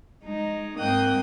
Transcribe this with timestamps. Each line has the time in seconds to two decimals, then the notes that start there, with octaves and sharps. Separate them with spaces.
0.24 G#3 D#4
0.78 G#2 A#3 C4 G5 D#6 F#6